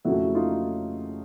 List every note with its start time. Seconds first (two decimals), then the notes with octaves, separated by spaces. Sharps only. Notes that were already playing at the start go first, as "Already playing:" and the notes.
0.05 F2 C#3 F#3 A3 E4 F#4
0.35 D#4 F4